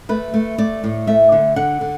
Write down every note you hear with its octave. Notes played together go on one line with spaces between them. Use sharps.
A3 B4
A3
A3 D5
A2
A3 E5
D3
D3 F#5
D3